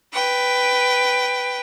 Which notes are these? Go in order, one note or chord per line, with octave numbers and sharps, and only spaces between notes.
B4 G5